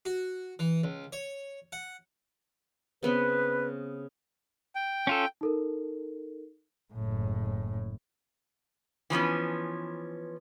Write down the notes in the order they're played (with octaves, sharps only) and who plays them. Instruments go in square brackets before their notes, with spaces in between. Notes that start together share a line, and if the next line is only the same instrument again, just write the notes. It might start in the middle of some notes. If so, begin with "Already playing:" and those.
[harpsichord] F#4
E3
C#2
C#5
F#5
[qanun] C#3 B3 C4 [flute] B4
[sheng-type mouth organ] G5
[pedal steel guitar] C#4 F4 A4
[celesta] D#4 A4 A#4
[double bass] F#1 A2
[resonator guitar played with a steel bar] E3 F3 B3 C#4